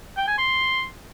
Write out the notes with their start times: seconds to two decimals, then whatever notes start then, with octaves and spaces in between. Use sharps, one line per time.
0.17 G5
0.27 G#5
0.38 C6